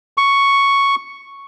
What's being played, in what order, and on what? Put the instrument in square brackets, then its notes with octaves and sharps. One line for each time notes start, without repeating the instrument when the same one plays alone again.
[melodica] C#6